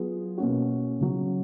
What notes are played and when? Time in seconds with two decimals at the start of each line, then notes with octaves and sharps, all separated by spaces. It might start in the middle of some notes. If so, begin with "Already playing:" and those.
Already playing: F#3 B3 F4 G#4
0.38 B2 A#3 C#4 F#4
1.00 C#3 F#3 C#4